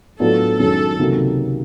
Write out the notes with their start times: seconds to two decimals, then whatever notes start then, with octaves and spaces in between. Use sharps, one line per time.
0.20 A2 F#3 B3 D4 F4 A4
0.59 F#2 D#3 G#3 C#4 A4
0.99 C#2 C3 D#3 F#3 A#3